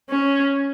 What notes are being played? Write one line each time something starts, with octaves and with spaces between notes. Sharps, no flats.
C#4